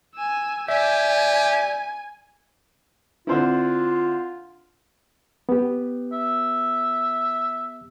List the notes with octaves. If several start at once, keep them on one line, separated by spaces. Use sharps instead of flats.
G#5 E6
G4 D5 E5 G#5
D3 C4 E4 F4
B3 G4
E5